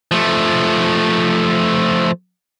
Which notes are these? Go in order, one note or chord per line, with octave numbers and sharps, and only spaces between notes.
F3 A3